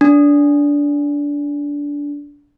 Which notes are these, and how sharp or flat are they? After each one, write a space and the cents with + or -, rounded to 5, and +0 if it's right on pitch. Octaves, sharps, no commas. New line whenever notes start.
D4 -20